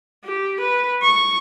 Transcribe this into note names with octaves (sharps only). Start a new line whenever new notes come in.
G4
B4
C#6